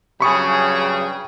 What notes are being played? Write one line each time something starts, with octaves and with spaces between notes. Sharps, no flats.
G2 C#3 F#3 G#4 G5 B5 C#6 D#6